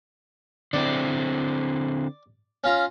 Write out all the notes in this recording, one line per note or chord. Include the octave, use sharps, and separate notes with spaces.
D3 C4 E4 D5
C#4 F4 A#5